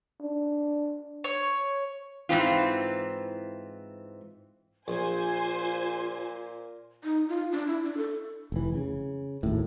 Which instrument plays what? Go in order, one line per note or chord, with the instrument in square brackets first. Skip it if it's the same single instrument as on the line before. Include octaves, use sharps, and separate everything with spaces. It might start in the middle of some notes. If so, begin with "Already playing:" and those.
[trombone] D4
[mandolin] C#5
[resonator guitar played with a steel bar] G#2 E3 C4 F4
[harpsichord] A#1 [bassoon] A#2 [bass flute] F4 [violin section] C5 G#5
[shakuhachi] D#4
F4
D4
E4
D4
A4
[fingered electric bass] F1 E3
C#3
G#1 D#2 A2